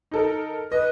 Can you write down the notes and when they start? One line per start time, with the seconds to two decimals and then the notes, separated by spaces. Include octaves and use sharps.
0.11 D#4 A4 A#4
0.72 B4 D#5